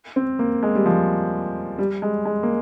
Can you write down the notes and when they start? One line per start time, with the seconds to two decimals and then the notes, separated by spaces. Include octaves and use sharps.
0.16 C4
0.39 A#3
0.63 G#3
0.75 G3
0.86 F3
1.79 G3
2.02 G#3
2.25 G#3
2.43 A#3